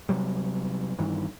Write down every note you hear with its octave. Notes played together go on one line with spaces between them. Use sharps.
C3 F#3 G3
G2 D#3 E3